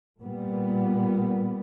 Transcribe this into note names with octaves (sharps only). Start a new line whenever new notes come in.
A#2 G3 B3